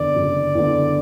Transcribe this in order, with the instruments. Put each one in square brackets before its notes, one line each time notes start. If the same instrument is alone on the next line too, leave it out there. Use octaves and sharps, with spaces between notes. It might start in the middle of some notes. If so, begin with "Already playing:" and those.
Already playing: [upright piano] F#1 E2 D3 [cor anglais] D5
[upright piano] F#1
E2 D3